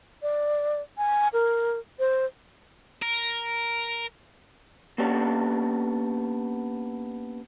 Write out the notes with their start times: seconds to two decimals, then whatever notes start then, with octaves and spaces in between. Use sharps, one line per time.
0.22 D5
0.98 G#5
1.33 A#4
1.99 C5
3.02 A#4
4.98 A#3 B3 C#4 D4 G4 C#5